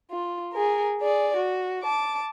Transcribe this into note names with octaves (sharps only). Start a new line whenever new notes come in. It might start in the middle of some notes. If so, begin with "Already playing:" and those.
F4
G#4 A#4
G#4 D5
F#4
A5 D6